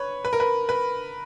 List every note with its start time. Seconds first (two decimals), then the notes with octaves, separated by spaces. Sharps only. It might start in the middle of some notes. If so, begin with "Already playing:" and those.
Already playing: B4 C#5
0.25 B4
0.33 A#4
0.40 B4
0.69 B4